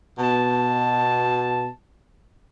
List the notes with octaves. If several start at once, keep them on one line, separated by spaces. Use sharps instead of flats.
B2 A5